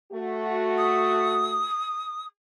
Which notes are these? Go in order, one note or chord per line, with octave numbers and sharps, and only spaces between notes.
A3 F#4
D#6